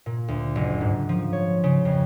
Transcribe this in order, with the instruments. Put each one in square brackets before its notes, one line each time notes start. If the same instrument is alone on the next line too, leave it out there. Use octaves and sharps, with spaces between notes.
[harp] A#2
D2
F#1
G#2
F3
C#5
C#3
F2